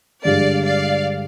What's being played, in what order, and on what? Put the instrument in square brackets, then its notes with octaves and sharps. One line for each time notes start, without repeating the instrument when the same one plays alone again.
[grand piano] G2 D3 G#3 D4 G4 [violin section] D5 F5
[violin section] D5 F5